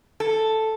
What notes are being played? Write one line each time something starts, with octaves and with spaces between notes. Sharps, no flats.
A4